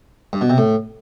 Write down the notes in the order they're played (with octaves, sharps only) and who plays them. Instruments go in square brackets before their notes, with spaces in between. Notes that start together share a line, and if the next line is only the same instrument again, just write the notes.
[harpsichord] G2
B2
C3
A2